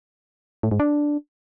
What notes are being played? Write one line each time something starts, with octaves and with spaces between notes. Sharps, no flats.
A2
G#2
D4